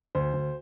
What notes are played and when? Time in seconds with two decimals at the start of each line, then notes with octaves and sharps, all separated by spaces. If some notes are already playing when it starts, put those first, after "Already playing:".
0.15 D2 C5
0.34 D2